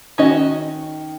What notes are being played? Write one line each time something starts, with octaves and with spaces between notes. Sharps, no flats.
D#3 C#4 F#4 D#5